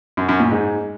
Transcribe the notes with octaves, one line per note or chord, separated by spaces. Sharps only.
F#2
F#2
A#2
G#2